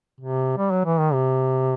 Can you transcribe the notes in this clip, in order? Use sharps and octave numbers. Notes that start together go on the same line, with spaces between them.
C3
G3
F#3
E3
D#3
C3